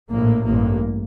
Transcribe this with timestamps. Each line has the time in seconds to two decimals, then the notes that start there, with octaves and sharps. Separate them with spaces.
0.11 A#1 A2 A#3
0.46 A1 G2 A#3